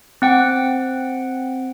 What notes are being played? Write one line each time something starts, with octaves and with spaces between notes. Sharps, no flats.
C4 F#5 G5